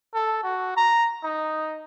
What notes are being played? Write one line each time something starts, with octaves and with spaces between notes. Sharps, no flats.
A4
F#4
A#5
D#4